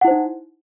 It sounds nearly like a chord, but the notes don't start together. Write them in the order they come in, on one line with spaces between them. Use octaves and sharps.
F#5 E4 C5 D#4